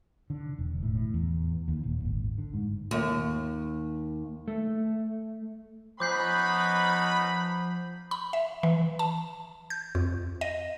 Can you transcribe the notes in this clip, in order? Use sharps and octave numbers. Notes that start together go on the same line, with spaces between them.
D3
E1
A2
E2
D#2
D#1
G#1
D3
G#2
D#2
A3
F3 B3 C#4 D#4 B5 D6 G6 C7
B5
E5
E3
A5
G6
F2
D#5